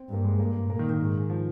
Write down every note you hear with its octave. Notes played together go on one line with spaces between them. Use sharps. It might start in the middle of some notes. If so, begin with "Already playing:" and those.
Already playing: C4
G2 A#3
G#3
G2 A#3
A#2 A#3
D#3
D#3
G#2
F3